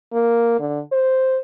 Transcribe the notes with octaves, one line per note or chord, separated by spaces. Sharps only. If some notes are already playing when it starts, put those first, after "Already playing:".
A#3
D3
C5